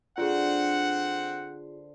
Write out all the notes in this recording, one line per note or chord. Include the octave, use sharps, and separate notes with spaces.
D3 C4 F4 G#4 C5 F#5